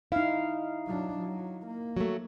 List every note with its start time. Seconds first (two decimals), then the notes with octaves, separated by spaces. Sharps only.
0.12 D#4 E4 F5
0.86 F#3 D4
1.18 F#3
1.67 A#3
1.97 F#3 A3